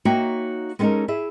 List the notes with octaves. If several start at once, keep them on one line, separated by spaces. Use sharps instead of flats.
A#3 D#4 F#4 C#5 E5 G5
G#3 B3 C#4 D#4 A4 A#4
E4 G#4 E5